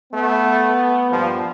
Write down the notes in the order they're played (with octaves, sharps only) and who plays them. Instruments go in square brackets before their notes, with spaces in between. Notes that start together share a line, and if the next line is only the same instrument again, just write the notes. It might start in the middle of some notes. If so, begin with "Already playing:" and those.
[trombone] A3 [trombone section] B3
[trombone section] G2 A#2 [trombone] F3